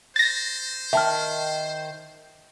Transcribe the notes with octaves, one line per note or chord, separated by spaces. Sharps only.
C5 A6 A#6
D#3 E5 A5 F6